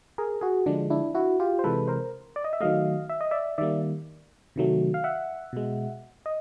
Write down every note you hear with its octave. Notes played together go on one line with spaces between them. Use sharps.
G#4 A#4
F#4 G#4
D3 F3 G#3 D4
D4 E4
E4 F#4
F4 G4
C5
C3 E3 G#3 A4 B4
A#4 C5
D5
D#5
E5
D#3 F#3 A3 D#5 F5
E5
D#5
D5 E5
D#3 G3 A#3 D5 E5
C3 D#3 F#3 A3
F5
E5 F#5
B2 G#3
D#5